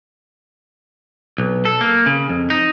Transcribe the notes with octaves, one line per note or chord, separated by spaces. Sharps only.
B1
A4
A#3
C#3
F2
D#4